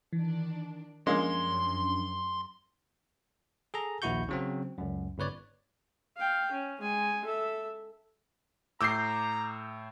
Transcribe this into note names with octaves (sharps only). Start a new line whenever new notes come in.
D#3 E3 D4
F#2 F3 G#3 A#3 C#4 D4 G#4 C6
G#4 A4 A#5
A#1 D#2 E4 F#4 C#6 G6
C#3 F#3 C4
C#2 F#2
G1 C#3 B4 C#5 D5
F5 G5
C#4
G#3 G#5
A4 E5
A2 A#5 D6 E6 G6 C7